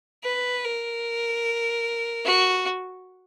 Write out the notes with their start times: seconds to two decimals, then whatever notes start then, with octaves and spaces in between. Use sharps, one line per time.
0.23 B4
0.64 A#4
2.25 F#4